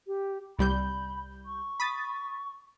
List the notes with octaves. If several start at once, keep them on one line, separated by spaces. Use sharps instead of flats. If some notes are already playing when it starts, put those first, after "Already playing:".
G4
C2 G3 B5 G6
C#6
B5 D#6 A6